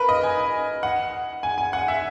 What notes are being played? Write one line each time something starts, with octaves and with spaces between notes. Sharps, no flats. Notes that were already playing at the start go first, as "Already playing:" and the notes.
Already playing: A#4 B4
D#5
G#5
F#5
G#5
G#5
F#5
E5